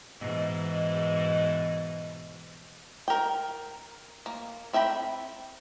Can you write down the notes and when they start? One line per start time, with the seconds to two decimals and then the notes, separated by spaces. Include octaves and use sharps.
0.20 G#2 B2 E3
3.08 A#4 G5
4.26 A#3
4.73 C4 E5 G5 A#5 B5